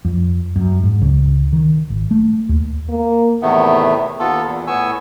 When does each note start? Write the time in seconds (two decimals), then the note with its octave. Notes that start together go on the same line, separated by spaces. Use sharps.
0.05 F2
0.56 F#2
0.84 G#2
1.02 C#2
1.53 D#3
1.90 G#1
2.11 A3
2.49 D#2
2.89 A#3
3.42 E2 A2 C3 D#3 A3 B3
4.19 D#2 B3 F4 A4
4.44 E2 A#2
4.67 A2 B3 G#5 C#6 E6